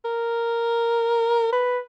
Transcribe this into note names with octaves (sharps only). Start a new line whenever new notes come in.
A#4
B4